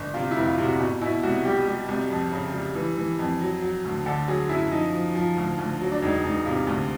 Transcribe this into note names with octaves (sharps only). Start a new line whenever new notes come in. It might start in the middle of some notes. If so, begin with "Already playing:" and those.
Already playing: G1
C3 F4
E4
F1
F4
C3
F#4
B2
B2 E4
C2 F#4
G3 G4
G3
C2
F2
C#3
G3
E3
E3
F2
F#3
F#3
D2
D3 A4
F#3 G#4
F#2 E4
F3 D#4
F3
F3
D2
D2
F#3
D4
E1 D#4
E1 D#4
C3 F4
D2